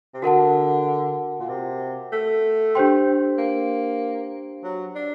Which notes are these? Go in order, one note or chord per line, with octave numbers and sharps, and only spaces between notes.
C3
D3 F#4 A#4 F#5 A5
A#2
C3
A3
D4 G4 C5 G5 C6
A#3
F#3
D4